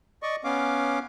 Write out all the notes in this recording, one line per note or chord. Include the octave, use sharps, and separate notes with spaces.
D5 D#5 C#6
B3 C#4 F5 D6